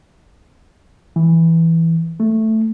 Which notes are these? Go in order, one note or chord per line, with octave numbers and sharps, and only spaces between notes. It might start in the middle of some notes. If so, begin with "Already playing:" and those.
E3
A3